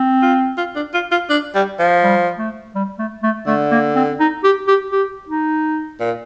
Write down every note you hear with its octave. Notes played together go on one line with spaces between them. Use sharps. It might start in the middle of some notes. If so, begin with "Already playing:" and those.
Already playing: C4
F4
F4
D4
F4
F4
D4
G3
F3
G3
A3
G3
A3
A3
D3 A3
A#3
C4
D#4
G4
G4
G4
D#4
A#2